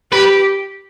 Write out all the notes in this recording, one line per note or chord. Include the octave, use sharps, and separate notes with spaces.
G4 B4